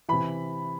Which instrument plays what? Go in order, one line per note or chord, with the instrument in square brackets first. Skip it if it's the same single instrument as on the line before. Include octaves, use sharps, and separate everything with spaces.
[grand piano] C3 E3 B5